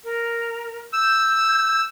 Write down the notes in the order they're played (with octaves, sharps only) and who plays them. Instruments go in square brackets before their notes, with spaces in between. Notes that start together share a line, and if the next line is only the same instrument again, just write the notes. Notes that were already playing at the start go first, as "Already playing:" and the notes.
[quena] A#4
[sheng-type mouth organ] E6 [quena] G6